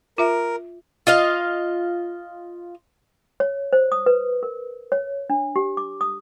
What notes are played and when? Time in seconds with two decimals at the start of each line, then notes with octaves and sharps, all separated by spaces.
0.18 F4 A#4 E5
1.07 F4 D#5 F5
3.40 C#5
3.73 C5
3.92 D#6
4.06 B4
4.43 A#4
4.92 C#5
5.30 D4
5.56 G4
5.77 D6
6.01 D#6